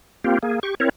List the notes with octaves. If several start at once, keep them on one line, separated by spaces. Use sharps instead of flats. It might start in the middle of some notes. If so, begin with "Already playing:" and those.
A#3 C4 F4 G4
A#3 G#4
G4 C#6
C4 E4 A#4 C#5